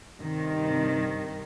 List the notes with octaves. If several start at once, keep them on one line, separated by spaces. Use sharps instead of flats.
G2 C3 D#3